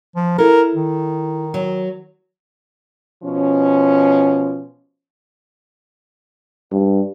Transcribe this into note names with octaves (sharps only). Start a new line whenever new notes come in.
F3
E4 A4 A#4
D#3
F#3
B2 F3 C#4
G2